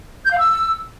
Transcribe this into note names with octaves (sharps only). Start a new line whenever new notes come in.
G6
F5
E6